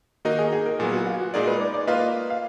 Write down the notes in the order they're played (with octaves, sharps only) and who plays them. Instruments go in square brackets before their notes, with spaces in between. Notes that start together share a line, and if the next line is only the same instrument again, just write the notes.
[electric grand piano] D#3 A#3 D#4 A#4 D#5 [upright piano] F#4
[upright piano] G#4
G#4
A#4
[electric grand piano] A#2 F#3 B3 [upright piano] G#4
[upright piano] F#4
F4
F#4
[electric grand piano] A#2 G#3 D#4 G#4 D5 [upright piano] A#4
[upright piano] B4
D5
D5
[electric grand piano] A#3 F4 B4 F5 [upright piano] D#5
[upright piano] F5